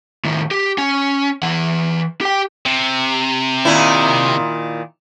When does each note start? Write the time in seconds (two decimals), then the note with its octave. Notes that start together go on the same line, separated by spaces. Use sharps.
0.25 A2 D#3
0.51 G4
0.78 C#4
1.43 E3 F#5
2.21 G4 G5
2.66 C3
3.65 A#2 D#3 E4